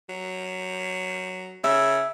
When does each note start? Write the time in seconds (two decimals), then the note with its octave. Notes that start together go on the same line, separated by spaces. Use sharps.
0.09 F#3
1.64 C#3 E5